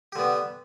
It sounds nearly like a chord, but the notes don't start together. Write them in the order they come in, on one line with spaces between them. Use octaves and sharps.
G4 D3 B3